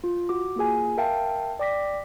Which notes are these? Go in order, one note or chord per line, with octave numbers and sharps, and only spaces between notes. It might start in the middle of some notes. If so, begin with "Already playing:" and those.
F4
F#4 D6
A#3 F4 G#4 G#5
A#4 E5 F5 G5 A5
D5 G5 D6 A#6 B6